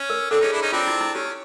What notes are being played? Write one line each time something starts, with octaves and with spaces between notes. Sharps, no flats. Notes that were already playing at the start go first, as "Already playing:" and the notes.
Already playing: C#4
A#4
C4 D4 A4
C#4 D#4 G#4
D4 E4
C#4 D#4
C4 D4 F4
E4
E4
C#4 G4